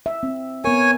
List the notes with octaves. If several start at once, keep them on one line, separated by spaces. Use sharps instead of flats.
E5
C4
B3 A#4 C#5 G#5